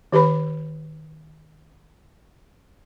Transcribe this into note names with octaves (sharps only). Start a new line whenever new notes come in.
D#3 G4 B4 B5